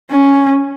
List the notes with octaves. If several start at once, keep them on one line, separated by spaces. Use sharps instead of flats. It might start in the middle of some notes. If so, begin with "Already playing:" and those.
C#4